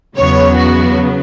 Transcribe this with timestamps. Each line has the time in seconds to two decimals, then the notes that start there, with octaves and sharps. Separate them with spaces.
0.17 E2 C#3 F#3 B3 C#5
0.55 F#4